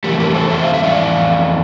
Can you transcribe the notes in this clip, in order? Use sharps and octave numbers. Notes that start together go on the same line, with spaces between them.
F2 E3 A3 G4 A#4
G4 A#4
A#4
A4 C5
C5 E5
F5
E5
D5 F5